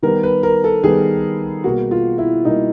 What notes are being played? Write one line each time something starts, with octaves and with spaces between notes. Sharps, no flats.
D#3 G3 B3 A#4
B4
A#4
A4
D#3 G3 B3 G#4
B2 G3 A#3 F#4
F4
E4
B2 G3 A#3 D#4